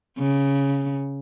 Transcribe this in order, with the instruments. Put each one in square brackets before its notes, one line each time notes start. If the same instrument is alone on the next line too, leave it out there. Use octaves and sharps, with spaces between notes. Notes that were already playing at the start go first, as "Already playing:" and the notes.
[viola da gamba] C#3